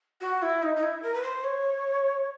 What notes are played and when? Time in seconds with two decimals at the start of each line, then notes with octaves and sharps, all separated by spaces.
0.21 F#4
0.42 E4
0.63 D#4
0.76 D#4
0.83 E4
1.03 A#4
1.14 B4
1.23 C5
1.44 C#5